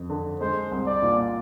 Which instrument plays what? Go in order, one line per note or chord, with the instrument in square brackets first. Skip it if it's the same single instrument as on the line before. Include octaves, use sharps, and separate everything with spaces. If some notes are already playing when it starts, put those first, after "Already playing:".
Already playing: [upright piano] F2
D3
[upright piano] G#3 [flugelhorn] C5
[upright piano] C2
[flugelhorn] D5
[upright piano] A#2